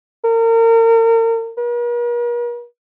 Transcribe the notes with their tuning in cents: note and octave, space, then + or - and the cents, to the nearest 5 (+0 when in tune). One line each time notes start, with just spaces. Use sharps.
A#4 -35
A#4 +45